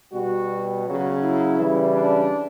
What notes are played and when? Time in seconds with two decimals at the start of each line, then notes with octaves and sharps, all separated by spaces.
0.13 B2 G3 F#4
0.86 C#3 F#3 F#4
1.22 E4
1.59 C#3 E3 G3
1.95 D4